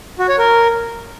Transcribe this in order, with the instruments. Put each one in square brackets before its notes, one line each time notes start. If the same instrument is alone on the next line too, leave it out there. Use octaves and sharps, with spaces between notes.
[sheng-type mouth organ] F#4
C#5
A#4